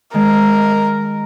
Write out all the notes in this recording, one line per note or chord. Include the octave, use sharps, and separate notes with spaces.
D#3 G#3 A#4